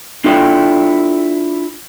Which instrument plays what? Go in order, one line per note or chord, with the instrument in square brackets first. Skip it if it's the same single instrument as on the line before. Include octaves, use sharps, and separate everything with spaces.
[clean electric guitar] D4 E4 F4 A4 D5 G5